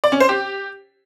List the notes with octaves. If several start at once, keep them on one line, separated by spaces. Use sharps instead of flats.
D5
C#4
C5
G4